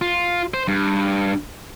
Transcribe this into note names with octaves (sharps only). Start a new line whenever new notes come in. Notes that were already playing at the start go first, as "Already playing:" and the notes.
F4
C5
G2